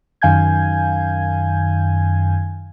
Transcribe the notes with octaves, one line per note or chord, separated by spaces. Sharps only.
F#2 D#3 F5 G#5 G6 G#6